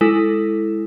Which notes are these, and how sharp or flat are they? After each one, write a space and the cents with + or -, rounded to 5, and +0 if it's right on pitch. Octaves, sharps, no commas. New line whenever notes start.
G#3 +0 E4 +0 A4 +0